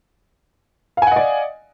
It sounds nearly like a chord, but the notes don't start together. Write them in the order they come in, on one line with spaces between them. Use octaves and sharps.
F5 G#5 F#5 D#5 D5